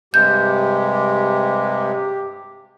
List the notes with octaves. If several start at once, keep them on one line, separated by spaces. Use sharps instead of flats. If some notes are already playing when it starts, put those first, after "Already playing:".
G2 C3 G#3 G4 G6